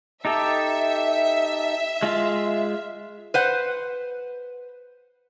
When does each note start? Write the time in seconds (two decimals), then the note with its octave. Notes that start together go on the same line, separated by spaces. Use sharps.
0.25 D#4 G4 A4 E5
2.03 G#3 F4 F5
3.34 B4 C5 F#5